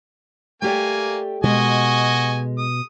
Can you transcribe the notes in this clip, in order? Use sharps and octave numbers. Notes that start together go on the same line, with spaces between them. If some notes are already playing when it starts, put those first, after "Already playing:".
A3 A#3 G4 D5 G#5
B2 G#3 F#4 D#5 G#5
D#6